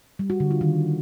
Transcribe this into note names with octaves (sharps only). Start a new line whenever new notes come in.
G3
F#4
D3
F4
D#3